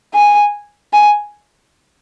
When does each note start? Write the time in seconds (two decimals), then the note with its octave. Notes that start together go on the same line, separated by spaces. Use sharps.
0.14 G#5
0.93 G#5